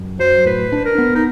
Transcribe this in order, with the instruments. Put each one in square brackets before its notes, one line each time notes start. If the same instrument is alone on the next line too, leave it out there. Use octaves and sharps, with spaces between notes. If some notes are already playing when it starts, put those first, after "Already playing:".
Already playing: [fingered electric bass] F#2
[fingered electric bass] F#3 [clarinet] C5
[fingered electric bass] A2 [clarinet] B4
[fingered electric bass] D4
[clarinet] A#4
[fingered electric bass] B3
[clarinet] D#4